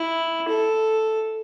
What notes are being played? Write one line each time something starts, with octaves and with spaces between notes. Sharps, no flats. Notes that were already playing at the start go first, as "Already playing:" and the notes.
Already playing: E4
A4